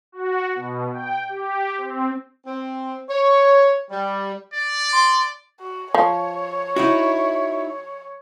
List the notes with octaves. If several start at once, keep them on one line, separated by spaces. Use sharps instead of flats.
F#4
B2
G5
G4
C4
C4
C#5
G3
D5
C6
F#4
F3 C#5
D#4 E4 F#4